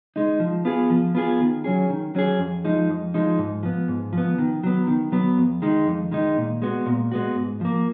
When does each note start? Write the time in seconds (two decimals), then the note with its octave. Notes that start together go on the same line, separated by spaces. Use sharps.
0.16 G#3 D#4
0.40 F3
0.65 B3 F4 G#4
0.90 F3
1.15 B3 F4 G#4
1.40 D#3
1.64 F#3 C#4 G#4
1.90 D#3
2.15 F#3 C#4 G#4
2.39 F2
2.65 F3 G#3 D#4
2.89 F2
3.14 F3 G#3 D#4
3.38 G#2
3.63 F3 B3
3.88 G#2
4.13 F3 B3
4.38 D#3
4.63 F#3 B3
4.87 D#3
5.12 F#3 B3
5.37 F2
5.62 D#3 G#3 D#4
5.87 F2
6.11 D#3 G#3 D#4
6.37 A#2
6.62 G#3 B3 F#4
6.86 A#2
7.12 G#3 B3 F#4
7.36 G#2
7.61 F3 A#3